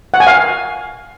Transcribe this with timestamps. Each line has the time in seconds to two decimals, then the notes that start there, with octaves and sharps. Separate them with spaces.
0.14 F#5
0.20 G#5
0.27 F5